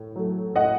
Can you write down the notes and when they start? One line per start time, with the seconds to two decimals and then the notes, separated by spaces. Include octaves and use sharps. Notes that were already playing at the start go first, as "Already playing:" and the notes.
Already playing: A2
0.16 F#3 A3
0.55 A2 D#5 F#5